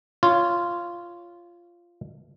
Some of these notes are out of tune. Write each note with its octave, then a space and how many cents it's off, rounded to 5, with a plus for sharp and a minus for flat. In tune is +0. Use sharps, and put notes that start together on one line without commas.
F4 -10 C#5 +5